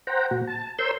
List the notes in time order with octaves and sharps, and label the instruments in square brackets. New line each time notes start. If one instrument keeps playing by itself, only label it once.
[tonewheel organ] C5 F#5 G5 A#5
A#2 F#4
A5
A#4 C5 C#5 C6 E6 G6